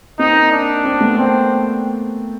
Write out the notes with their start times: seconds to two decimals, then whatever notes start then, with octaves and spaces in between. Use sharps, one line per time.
0.19 A#3 C4 D#4
0.52 D4
0.84 A#3 C4
1.01 A3 B3
1.18 C4